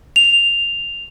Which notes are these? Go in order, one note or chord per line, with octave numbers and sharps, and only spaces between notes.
F7